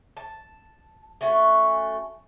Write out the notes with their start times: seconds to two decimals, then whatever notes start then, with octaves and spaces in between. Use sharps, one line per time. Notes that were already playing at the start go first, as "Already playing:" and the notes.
0.17 A5
1.21 A3 C#4 F#4